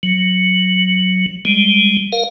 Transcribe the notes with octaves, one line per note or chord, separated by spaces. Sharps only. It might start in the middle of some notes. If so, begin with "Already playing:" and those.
F#3
G3 G#3
A#4 F5